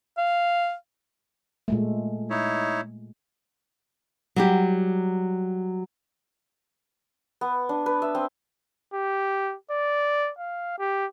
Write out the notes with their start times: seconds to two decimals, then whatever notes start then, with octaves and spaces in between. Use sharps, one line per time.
0.18 F5
1.68 A#2 G#3 A3
2.30 D#4 E4 C#5
4.36 F#3 G3 G4
7.41 B3
7.69 D4
7.86 B4
8.02 E5
8.15 C4
8.94 G4
9.71 D5
10.39 F5
10.79 G4